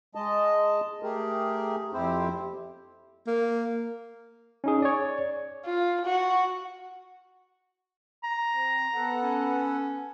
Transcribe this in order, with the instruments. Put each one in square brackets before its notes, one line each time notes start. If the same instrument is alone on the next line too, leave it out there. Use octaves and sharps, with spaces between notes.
[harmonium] G#3 D#5 A5
A3 G4 G#4 A#4
F2 C4 E4 G4 C5
[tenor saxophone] A#3
[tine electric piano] C#4 D#4 G#4
C#5 D5
[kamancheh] F4
F#4
[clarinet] A#5
[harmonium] C4
B3 A4 F#5
[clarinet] C#4